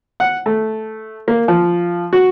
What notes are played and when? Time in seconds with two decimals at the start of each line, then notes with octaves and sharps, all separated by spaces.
0.20 F#5
0.46 A3
1.28 A#3
1.48 F3
2.13 F#4